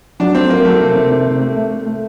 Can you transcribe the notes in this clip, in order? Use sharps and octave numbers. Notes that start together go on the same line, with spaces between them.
F#3 D4
A3 C4
F#3 A#3
F#3 A3
C3 A#3
C3
C3
C3
A3
A3
A3
A3